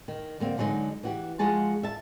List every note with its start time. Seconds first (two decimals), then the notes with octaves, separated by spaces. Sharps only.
0.08 D#3
0.40 D3 A#3 C4
0.58 D3 F#3 G#3 B3 D#4
1.03 E3 F#4 G4
1.39 F3 G#3 F#4 G#4 A5
1.83 E5 A5